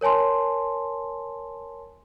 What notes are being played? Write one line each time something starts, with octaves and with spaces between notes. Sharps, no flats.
A#4 C#5 G#5 A5 C6